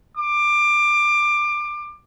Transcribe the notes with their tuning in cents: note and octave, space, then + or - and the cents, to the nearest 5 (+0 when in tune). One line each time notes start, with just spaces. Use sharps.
D6 +20